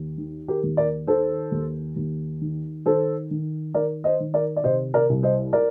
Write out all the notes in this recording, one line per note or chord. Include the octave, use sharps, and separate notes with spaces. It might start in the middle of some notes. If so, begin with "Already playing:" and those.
Already playing: D#2
D#3
G4 A#4
D#2
A#4 D5
D#3 A4 C5
D#2
D#2
D#3
D#3 A4 C5
D#3
D#3 A#4 D5
C5 D#5
D#3
A#4 D5
D5
C3 C5 D#5
A#4 D5
C2
C5 D#5
A#4 D5